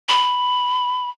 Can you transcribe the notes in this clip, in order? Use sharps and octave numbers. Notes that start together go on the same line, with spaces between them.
B5